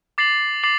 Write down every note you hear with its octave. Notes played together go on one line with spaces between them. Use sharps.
D6 A6 C7 F#7
D6 A6 C7 F#7